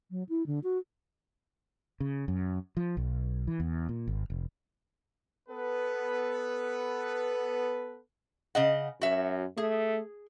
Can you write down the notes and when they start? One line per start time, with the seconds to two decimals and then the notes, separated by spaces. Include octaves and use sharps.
0.11 F#3
0.29 E4
0.46 D3
0.63 F#4
2.00 C#3
2.28 F#2
2.77 F3
2.97 B1
3.47 E3
3.60 E2
3.89 A#2
4.07 G#1
4.30 F1
5.49 B3 A4 B4
8.55 C#3 D#5 F#5
9.01 F#2 F#4 E5
9.58 A3 G#4